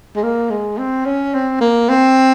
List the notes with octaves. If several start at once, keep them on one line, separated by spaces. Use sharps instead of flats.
G#3
A#3
G#3
C4
C#4
C4
A#3
C4